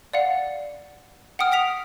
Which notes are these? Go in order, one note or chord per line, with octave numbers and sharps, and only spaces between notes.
D5 F5 F#5
F#5 G5 D#6 F6
G5 D#6 B6 F7